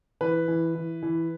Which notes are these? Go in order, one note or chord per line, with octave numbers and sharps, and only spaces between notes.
E3 B4
E3
E3
E3